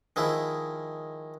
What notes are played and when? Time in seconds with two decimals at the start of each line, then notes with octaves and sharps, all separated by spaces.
0.16 D#3 F3 G#3 E4